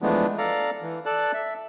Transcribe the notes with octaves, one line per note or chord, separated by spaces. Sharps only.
E3 F3 G#3 A3 B3 D4
A4 D5 F5 A#5
E3
A4 D5 A5 F#6
E5